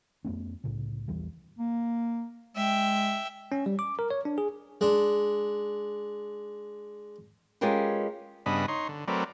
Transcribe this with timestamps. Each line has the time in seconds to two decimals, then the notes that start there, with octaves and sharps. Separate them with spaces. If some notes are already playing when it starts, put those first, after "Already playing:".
0.25 F2 A3 B3 C#4
0.64 C2 A2 C#3
1.08 A#1 E2 E3 G3
1.58 A#3
2.56 G#3 E5 G5
3.52 C#4
3.66 G3
3.79 D6
3.99 A#4
4.11 C#5
4.25 D4
4.38 G#4
4.81 G#3 D4
7.61 G#3 C#4 F4 G4 A#4 B4
8.46 G2 C#3 B3 D4 D#5 B5
8.68 D#4 C#5 C6
8.88 D3
9.08 F#3 A3 C4 A#4 B4 D5